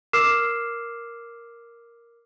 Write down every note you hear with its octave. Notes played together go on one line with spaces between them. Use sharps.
A#4 D6 E6 F6 C7 E7